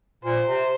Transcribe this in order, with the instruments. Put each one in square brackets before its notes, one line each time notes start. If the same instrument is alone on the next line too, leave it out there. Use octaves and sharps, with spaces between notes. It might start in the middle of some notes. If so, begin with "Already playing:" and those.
[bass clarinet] A#2 [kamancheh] C5
[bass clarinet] C3